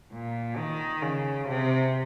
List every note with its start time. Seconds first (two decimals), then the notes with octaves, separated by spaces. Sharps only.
0.13 A#2
0.57 D#3
1.02 C#3
1.47 C3